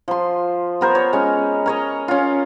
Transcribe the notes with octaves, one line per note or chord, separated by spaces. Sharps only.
F3 C6
B3 A#4 C5
C#5
G#3 C#4
A#4 C#5 D#5
C#4 F4